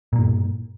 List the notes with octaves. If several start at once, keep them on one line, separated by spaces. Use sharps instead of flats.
G2 A#2 A#3